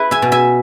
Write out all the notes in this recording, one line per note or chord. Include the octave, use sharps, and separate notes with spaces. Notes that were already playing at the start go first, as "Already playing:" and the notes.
Already playing: E4 B4
E5 G#5
B2
E5 G#5